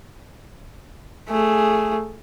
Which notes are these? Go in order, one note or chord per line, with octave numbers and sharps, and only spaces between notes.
A3 G#4